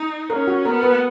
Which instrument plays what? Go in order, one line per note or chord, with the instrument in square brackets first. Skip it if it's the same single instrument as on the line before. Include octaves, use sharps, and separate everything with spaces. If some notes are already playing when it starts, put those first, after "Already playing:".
Already playing: [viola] D#4
[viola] C#4 [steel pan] A#4
[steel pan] F#4
[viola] B3 [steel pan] A#4
[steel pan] B4